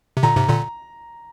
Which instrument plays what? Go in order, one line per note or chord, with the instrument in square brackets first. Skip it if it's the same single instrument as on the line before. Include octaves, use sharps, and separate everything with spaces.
[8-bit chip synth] C3
[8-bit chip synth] A#2 D3 [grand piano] A#5
[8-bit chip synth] G#2 C3
A#2 D3